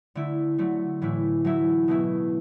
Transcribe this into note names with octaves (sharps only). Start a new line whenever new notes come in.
D3 A3 E4
D3 F#3 A3
A2 E3 A3 E4
F#3 A3 E4
B2 A3 E4